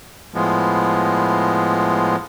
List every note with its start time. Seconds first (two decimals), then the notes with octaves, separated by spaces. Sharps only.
0.34 A2 F3 G#3 B3